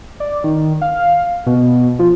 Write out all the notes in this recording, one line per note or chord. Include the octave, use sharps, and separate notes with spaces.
D5
D#3
F5
B2
F3